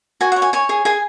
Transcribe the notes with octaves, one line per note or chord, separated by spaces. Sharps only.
F#4 G#5
C#5 F#5
G#5
C#5 G#5
G#4 G#5
G#4 G#5